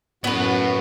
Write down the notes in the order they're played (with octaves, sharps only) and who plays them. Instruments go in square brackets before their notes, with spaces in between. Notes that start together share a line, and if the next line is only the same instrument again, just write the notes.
[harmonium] F#2 F#4 [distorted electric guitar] A2 [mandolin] B3 B4